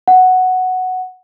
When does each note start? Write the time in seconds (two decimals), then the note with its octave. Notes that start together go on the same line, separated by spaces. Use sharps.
0.08 F#5